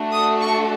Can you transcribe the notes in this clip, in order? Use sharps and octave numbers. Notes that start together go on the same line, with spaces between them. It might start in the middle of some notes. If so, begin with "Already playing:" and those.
Already playing: A3 D4 F#4 A4
D#6
C#6